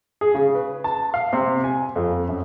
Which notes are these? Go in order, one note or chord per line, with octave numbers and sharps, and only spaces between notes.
G#4
C#3
B4
A5
F5
C3
G#5
F2
F#2